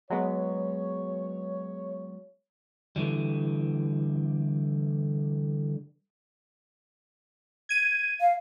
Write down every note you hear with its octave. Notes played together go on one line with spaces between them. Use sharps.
F#3 G#3 B3 C#5
D3 E3 G3
G#6 D#7
F5